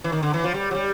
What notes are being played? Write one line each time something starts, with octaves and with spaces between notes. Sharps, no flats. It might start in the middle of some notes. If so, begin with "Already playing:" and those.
E3
D#3
D3
E3
F3
G3
F#3
G3